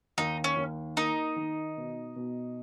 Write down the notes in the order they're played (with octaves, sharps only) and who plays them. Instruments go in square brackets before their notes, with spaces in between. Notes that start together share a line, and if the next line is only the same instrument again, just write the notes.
[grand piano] D#2 [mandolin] D#4
[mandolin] C#4
[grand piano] D#2
[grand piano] A#3 [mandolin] D#4
[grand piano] D#3
B2
B2